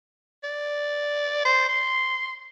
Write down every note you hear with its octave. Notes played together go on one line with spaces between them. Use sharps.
D5
C5
C6